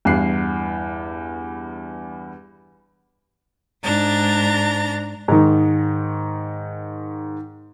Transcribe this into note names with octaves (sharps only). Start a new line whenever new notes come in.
E2 G2 F#6 C7
G#2 D4 A#5 A6
G#2 D#3